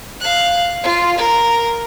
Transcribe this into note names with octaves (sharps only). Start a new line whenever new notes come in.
F5 F#6
F4
A#4